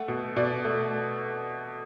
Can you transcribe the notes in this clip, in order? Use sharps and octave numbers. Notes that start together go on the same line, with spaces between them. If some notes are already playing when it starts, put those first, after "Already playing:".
Already playing: A3 F#5
B2
B2 D5
A3